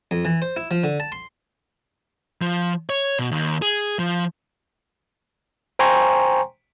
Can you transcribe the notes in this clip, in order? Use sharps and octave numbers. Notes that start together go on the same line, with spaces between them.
F2
E3
C5
E4
F3
D3
A5
C6
F3
C#5
B2
D#2
G#4
F3
C5 G5 G#5 A#5 C6 C#6